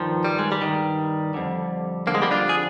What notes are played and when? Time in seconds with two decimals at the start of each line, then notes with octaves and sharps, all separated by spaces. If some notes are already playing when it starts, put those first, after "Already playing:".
Already playing: G2 D#3 F3
0.25 G3
0.39 G#3
0.52 G3
0.62 G2 D#3
1.34 F2 D3
2.07 F2 D3 A#3
2.15 G#3
2.22 G3 A#3
2.31 D4 F4
2.49 G#4